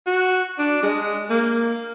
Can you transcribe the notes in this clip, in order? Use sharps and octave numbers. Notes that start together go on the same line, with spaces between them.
F#4
D4
G#3
A#3